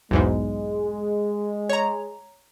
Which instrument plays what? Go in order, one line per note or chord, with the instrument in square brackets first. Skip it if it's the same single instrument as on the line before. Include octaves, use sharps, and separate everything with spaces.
[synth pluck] B1 E2 G#2 [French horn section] G#3
[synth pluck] C#5 A#5